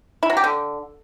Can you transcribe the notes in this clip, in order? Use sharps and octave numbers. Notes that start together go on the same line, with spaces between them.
E4
F#3
G4
D3